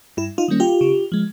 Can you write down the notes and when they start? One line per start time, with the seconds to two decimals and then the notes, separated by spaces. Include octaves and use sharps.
0.17 G2 E4
0.38 D#4 F4
0.48 D#3 G3 A#3 C#4
0.60 F4 G4
0.81 C#3
1.12 F3 G#3